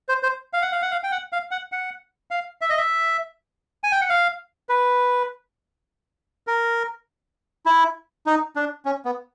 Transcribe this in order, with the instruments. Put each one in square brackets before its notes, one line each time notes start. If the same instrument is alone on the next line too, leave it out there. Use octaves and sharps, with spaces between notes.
[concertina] C5
C5
F5
F#5
F5
F#5
F5
G5
F#5
F5
F#5
F#5
F5
E5
D#5
E5
G#5
G5
F#5
F5
B4
A#4
E4
D#4
D4
C#4
B3